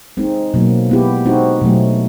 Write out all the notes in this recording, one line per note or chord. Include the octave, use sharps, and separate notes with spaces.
G#3 C4 D#4
B2 F#3 A#3
G#3 B3 E4 G4
G#3 C4 D#4 F#4
B2 F#3 A3